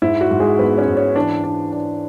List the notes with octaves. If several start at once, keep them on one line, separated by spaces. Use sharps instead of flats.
G#2 E4
F#4
G#2
G#3 G#4
G#2 B3 B4
C#4 C#5
G#2
C#4 C#5
E3 D4 D5
D4
D4